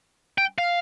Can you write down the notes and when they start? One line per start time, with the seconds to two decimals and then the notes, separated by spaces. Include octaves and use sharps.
0.38 G5
0.58 F5